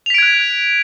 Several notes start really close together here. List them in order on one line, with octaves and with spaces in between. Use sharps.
F7 B6 D7 G#6 F#6